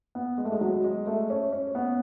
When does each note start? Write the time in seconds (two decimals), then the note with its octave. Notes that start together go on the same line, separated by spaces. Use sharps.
0.15 B3
0.38 G#3
0.45 A3
0.52 G#3
0.61 F#3
0.84 G#3
1.07 A3
1.30 C#4
1.52 C#4
1.75 B3